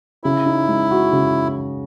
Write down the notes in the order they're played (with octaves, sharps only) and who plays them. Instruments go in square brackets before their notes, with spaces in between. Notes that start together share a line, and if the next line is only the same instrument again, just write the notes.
[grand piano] C#3 [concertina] E4
[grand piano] D#4
G#3
F#4
C#3